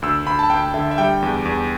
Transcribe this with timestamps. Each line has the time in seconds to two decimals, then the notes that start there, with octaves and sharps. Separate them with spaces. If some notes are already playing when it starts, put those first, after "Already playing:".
0.02 D2 E6
0.26 D2 B5
0.39 A5
0.50 D2 G5
0.74 D3 E5
0.91 E5
0.98 G3 G5
1.22 E2
1.45 E2